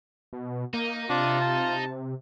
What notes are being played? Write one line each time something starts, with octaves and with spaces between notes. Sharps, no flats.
B2
A#3 D#4
C3 D4 F4
A5